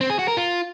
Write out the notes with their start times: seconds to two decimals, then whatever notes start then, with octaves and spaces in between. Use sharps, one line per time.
0.01 C4
0.10 G#4
0.19 F#4
0.28 A#4
0.37 F4